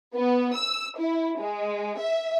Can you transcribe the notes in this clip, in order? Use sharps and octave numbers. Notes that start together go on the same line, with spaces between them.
B3
E6
E4
G#3
E5